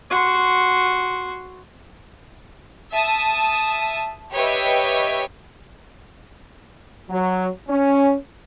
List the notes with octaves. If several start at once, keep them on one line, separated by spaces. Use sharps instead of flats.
F#4 C6
E5 A5 D#6
G4 B4 C#5 D#5 E5 G5
F#3
C#4